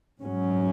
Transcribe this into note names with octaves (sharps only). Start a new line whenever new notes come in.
G#2 F#3 C#4